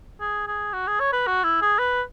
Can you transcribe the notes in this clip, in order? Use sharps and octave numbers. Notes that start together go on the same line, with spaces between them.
G#4
G#4
F#4
G#4
C#5
B4
F#4
E4
G#4
B4